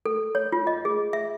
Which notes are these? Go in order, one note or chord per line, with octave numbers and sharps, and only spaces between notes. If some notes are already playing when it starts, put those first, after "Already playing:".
A4
C#5
F4
D#5
G#4
E5